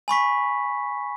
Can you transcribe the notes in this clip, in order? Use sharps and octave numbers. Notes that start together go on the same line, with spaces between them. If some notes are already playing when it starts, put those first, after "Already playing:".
G#5 B5 C#6 B6